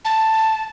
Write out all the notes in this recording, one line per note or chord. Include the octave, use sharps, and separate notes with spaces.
A5